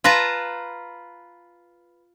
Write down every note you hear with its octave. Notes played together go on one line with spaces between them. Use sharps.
F4 B4 A5 A#5